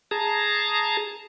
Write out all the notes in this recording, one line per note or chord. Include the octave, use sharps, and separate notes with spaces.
G#4 A5 A#5